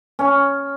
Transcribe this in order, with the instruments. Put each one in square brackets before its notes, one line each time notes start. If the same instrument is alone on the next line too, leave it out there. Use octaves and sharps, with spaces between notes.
[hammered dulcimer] C#4